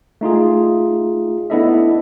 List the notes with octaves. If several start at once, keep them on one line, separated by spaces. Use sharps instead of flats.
A3 D#4 F4 G#4
B3 D4 E4 A4 D#5 E5